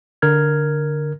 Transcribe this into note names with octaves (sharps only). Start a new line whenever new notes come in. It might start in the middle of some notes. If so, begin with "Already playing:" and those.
D3 A#4 F6 G#6